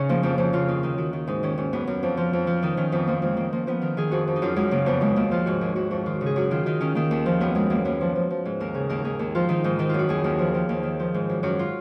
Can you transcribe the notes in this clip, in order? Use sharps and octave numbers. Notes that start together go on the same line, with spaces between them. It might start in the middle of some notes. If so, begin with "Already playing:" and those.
Already playing: C#3 C#4 D#4
F3 A#3
F2 A#3
F2 C#4
C#3 F4
D#2 D#4
D#3 D#4
D#3 F#4
D#3 F#4
G#2 D#4
D#3 C#4
G#2 C#4
F#2 B3
F#2
F2
F3
F2
F3
D#3 D#4
D#3 C#4
F2 B3
F3 A#3
F2 G#3
D#3 A#3
F3 A#3
F3 B3
D#3 A#4
D#3 G#4
F2 F#4
F2
D#4
F#2 F4
F#2 G#3
C#3 A#3
F2 B3
D#2 G#3
D#2 A#3
F3 F4
G#2 F#4
D#2 G#4
D#2 F#4
F2 F#4
D#3 F4
C#3
G#4
F#2 F#4
D#3 F4
D#3 D#4
D#3 C#4
D#3 A#3
D#2
F3
F#2 B3
F#2 G#3
F#2 A#3
F#2 B3
F3
F3
F3
G#2
D#2 A#4
C#3 G#4
D#2 A#4
D#2 G#4
D#2
F3 F4
D#3 D#4
G#2 D#4
D#3 D#4
F#2 F4
F#4
D#2 G#4
D#2 A#4
F3 A#4
F3 A#4
D#2
D#3
F3
G#2
F#2
F#2 F#4
F4